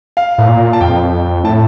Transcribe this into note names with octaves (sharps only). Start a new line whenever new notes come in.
F5
A2
A#2
A5
F2 G5
A2 A5